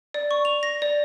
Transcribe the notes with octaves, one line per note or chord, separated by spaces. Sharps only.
D5
C#6
F7
A#6
D5